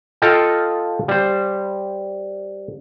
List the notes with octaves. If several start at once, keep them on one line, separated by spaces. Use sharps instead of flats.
F4 A4 D#5 F5 G5
G3 C5